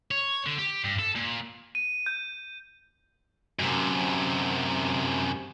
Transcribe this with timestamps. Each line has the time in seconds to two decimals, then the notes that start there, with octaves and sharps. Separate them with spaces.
0.11 C#5
0.46 D3
0.58 G4
0.84 G2
0.99 A4
1.16 A#2
1.75 D#7
2.06 G6
3.59 F#2 C3